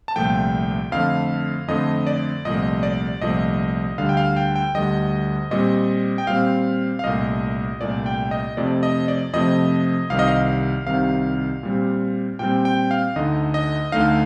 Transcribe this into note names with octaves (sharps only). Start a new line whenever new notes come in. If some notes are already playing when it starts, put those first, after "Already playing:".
A5
C2 A#2 F3 A3 G5
F2 D3 A3 F5
F2 D3 A3 D#5
D5
C2 A#2 F3 A3 D#5
D5
C2 A#2 F3 A3 D#5
D2 D3 G3 F5
G5
F5
G5
G5
D2 D3 G3 D#5
A#2 G3 C4 D#5
G5
A#2 G3 C4 F5
F5
C2 A#2 A3 D#5
C2 A#2 A3 D5
G5
D#5
F2 C3 F3 A3 D5
D#5
D5
F2 C3 F3 A3 D#5
C2 C3 D#3 F5
D#5
F5
C2 C3 D#3 F5
A#2 G3 C4
A#2 G3 C4 G5
G5
F5
D2 D3 A3 D#4 D#5
D#5
D2 D3 A3 D#4 F5